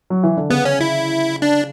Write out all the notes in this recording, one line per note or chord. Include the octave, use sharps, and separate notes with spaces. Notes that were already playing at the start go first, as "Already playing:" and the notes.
F#3
E3
D3
C#3 B3
C#4
E4
D4